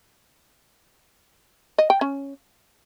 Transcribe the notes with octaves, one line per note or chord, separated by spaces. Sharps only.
D#5
G5
C#4